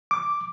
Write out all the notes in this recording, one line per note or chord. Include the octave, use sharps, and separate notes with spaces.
D6